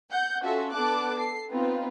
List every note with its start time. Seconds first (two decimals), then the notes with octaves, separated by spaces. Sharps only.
0.10 F#5 G6
0.41 C#4 F4 F#4 A4 E5
0.72 B3 D4 A4 A5 D6 F#6
1.17 A4 C7
1.49 B3 C4 D#4 F4 B4